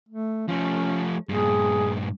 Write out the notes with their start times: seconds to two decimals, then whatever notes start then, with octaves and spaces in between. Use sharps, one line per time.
0.09 A3
0.48 F3 A3 C#4
1.29 G2 A#2 G#4